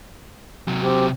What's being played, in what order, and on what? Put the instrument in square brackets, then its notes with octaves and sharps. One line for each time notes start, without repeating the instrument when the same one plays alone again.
[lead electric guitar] C3 F#3
[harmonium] C4 G4